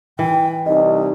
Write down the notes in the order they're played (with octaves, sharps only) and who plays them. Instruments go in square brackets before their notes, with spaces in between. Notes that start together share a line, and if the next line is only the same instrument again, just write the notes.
[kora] E3 [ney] G5
[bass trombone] C2 [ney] D#4 [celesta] D#5